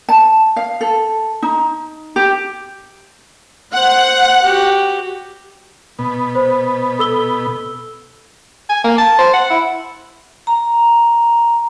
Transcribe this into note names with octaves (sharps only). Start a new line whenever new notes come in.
A5
F5
A4
D#4
G4
C5 F#5
F#4 G4
B2 B3
C5
A4 E6 G7
G#5
A#3
A5
C5
F#5
E4
A#5